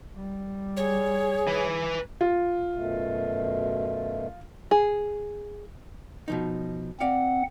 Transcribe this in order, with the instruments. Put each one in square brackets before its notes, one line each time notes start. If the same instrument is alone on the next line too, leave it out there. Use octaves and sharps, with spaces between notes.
[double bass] G3
[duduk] G#4 [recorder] C#5
[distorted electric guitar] B4 G#5
[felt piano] F4
[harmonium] F#2 B2 A3
[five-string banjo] G#4
[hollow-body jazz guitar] B2 F3 D#4
[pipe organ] C4 F#5 [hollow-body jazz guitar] D5 F5